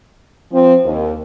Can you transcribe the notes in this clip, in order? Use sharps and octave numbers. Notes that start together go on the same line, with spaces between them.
F3 C4
D#2